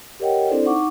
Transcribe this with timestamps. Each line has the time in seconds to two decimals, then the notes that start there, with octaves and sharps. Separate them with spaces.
0.20 G4 A#4 C#5 D#5 F#5 G5
0.48 C4 D4 E4 A4 C5 D5
0.65 D#4 F#5 C#6 D6